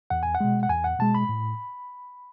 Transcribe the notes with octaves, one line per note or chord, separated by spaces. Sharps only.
E2 F#5
G#5
F#5
B2 G#3
F#5
E2 G#5
F#5
B2 G#3 A5
B5
A2